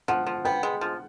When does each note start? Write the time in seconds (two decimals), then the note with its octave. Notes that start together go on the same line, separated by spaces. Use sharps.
0.08 F3 F#5
0.27 F3
0.45 B3 G5
0.63 G#3
0.81 F3